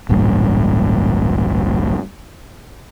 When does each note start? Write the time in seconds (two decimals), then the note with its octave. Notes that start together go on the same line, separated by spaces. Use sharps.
0.09 D1 A1 G2 A#2